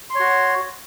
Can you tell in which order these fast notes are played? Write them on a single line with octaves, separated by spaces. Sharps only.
C6 C#5 F#4